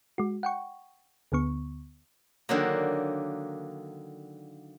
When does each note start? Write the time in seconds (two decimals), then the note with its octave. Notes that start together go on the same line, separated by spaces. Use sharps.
0.18 G#3 F#4
0.43 F#5 G5 C#6
1.32 D2 D3 B3 C#6
2.49 D3 D#3 F#3 A#3